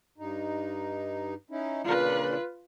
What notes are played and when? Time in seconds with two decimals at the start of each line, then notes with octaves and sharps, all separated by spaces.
0.18 G2 D#4
1.51 C#4 D#4 E4
1.84 A#2 C#3 D4 F4 B4